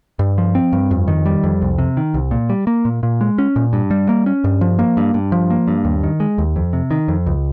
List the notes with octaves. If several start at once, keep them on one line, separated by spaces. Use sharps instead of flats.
G2
F3
C4
G2
F2
D#3
G3
F2
C2
C3
D#3
C2
A#2
G3
A#3
A#2
A#2
G#3
C#4
A#2
G2
G3
A#3
C#4
G2
F3
A#3
G2
G2
F3
A#3
G2
D#2
D#3
G#3
D#2
F2
C3
D#3
F2
C#2